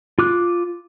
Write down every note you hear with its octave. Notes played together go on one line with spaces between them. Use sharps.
F4 D6 F#6